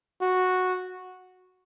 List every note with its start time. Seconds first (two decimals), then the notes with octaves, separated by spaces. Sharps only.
0.21 F#4